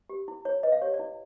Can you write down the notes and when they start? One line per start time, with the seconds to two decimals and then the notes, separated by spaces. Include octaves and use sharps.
0.10 G4
0.28 E4
0.45 E4 C#5
0.63 B4 D#5
0.72 F5
0.82 G4 C#5
0.94 D5
0.99 E4